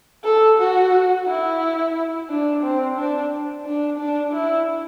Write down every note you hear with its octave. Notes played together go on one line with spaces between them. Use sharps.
A4
F#4
E4
D4
C4
D4
D4
D4
E4